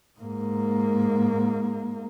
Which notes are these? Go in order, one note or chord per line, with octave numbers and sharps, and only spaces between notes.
G#2 A#3